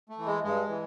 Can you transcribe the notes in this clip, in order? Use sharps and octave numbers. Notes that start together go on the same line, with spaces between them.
A3
E3
G#3
G2 G#3
E3